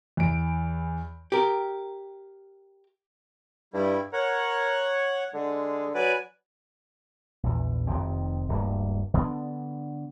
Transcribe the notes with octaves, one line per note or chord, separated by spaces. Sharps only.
E2 D7
G4 A#4
G2 G3 E4
A#4 C#5 F#5
D3 G#3
F#3 B4 D5 G#5
A#1 E2
F1 B1 D#3 C4
D1 G2 A#3
D3 B3 C#4 D4